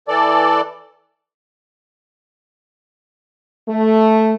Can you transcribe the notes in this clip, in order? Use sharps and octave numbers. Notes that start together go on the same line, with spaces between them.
E3 A4 D5
A3